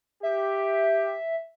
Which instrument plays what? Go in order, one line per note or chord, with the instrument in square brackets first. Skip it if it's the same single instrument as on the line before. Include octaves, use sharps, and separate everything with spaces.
[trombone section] G4 [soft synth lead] E5